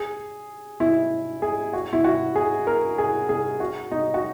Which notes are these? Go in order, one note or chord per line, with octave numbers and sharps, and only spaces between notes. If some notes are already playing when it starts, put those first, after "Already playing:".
Already playing: G#4
E4
G#4
F#4
E4
F#4
G#4
A#4
G#4
G#4
F#4
D#4
F#4